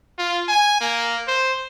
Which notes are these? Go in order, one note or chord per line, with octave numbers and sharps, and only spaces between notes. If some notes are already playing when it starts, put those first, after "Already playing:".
F4
G#5
A#3
C5